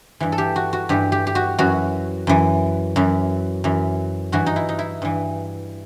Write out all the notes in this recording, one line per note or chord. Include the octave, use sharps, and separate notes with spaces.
G2 E3
A4
G4
F#4
F#4
G2 E3 G4
G4
G4
F#4
F#2 E3 F#4
F#2 E3
F#2 E3
F#2 E3
G2 E3 F#4
D#4
E4
D#4
E4
G2 E3